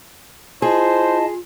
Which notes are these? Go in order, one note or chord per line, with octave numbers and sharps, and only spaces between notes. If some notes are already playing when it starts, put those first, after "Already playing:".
E4 F4 G#4 C5 D#5 A5